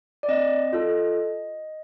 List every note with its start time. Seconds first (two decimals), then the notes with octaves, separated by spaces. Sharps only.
0.23 D5
0.28 C4 D#5
0.73 F4 A4